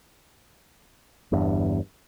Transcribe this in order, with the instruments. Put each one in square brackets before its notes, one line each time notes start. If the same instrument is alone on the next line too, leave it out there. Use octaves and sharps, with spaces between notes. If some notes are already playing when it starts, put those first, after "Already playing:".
[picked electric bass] G1 E2 G2